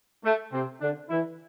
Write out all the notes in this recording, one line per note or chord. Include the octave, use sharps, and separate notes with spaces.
A3
C3 C4
D3 D4
E3 E4